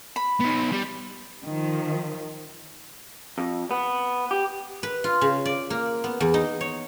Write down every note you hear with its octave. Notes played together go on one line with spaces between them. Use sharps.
B5
B3 D#4
G3
D#3 F3
F2
B3
G4
B4
F4
C#3
D5
A#3
B3
E2
D#4
C#5